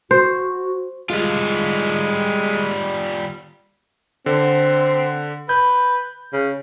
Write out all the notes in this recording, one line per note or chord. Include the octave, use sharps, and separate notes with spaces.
F#4 C5
G3 G#3 F4
D3 C4
B4 G6
C#3